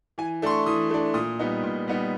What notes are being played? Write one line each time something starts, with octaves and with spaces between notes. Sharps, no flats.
E3 G#5
A3 D4 C6
C#6
E3 D#6
A3 D4
A#2 D#6
G3 B3 D#4
A#2
G3 B3 D#4